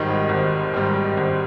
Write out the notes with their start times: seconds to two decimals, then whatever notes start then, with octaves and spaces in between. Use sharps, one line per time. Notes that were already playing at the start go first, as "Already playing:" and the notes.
Already playing: G#1 G#2 D#3 G3
0.29 G#1
0.74 G#2 D#3 G3
1.17 G#1